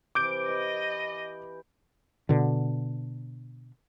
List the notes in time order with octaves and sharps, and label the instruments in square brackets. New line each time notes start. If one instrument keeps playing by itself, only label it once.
[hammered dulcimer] C3 E3 [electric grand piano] D6 G6 D7
[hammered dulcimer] B4 [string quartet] D#5
[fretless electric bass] B2 D3